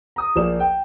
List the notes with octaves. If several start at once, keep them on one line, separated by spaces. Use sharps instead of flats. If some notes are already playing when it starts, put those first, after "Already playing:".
A#5 D#6
A#1 F3 A#3 G#4 D5 E7
G5